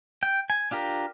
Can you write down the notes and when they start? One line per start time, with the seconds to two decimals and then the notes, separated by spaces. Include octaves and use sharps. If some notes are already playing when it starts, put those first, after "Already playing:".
0.23 G5
0.50 G#5
0.71 D4 F4 G4 A#4